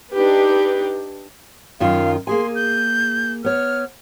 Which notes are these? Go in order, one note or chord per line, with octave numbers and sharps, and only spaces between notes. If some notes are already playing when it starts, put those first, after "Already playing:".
D4 D#4 G4 B4
F#2 D#3 F4 F5
A#3 G#4 G#5 C6
G6
B3 C#5 F6